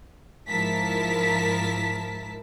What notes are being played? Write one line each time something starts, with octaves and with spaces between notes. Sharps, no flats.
G#2 F3 E4 A#4 A5 B6